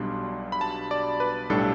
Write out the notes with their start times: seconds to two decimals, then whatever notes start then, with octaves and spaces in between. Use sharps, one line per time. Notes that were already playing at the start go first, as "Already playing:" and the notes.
Already playing: B1 B2 G3 D4 C6
0.52 B5
0.61 A5
0.91 D5
1.20 B4
1.49 B1 A2 G3 D4 A4